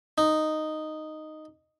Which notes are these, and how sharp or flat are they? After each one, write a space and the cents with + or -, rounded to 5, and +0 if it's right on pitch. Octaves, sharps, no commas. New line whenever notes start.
D#4 -5